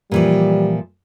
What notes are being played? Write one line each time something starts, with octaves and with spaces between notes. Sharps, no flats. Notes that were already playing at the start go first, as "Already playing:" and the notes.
A#2 E3 F3 G3